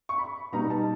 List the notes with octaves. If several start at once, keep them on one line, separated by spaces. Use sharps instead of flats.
C#6
B5
B2 G3 B3 D#4 A#5
A#5
A5